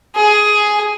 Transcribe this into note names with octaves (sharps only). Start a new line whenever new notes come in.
G#4